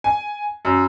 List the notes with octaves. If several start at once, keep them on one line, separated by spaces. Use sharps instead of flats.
G#5
F#2